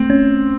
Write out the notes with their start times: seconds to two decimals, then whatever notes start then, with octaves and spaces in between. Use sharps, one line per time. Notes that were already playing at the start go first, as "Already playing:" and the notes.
Already playing: A3 C4
0.10 C#4